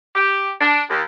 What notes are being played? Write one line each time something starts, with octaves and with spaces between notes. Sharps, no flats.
G4
D4
D#2